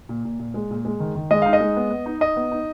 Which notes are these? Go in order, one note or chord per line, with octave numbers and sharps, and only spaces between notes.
A#2
A#2
A#2
G#3
A#2
G#3
D#3
D#3
G#3 D#5
D#4 F5
D#5
G#3
B3
B3
D#4
D#4 D#5
B3
D#4